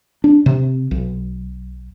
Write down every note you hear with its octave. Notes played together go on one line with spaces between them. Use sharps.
D4
C3
B1